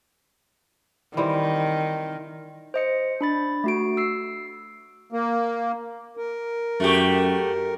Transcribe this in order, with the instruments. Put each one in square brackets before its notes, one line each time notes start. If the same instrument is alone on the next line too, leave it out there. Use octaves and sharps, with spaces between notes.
[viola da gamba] D#3 [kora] E3 G3 C4
[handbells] C5 D#5 C#7
D4 B5 A6
A3 F#4 D7
E6 C7
[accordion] A#3
[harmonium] A#4
[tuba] F#2 [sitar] A3 F#4 G4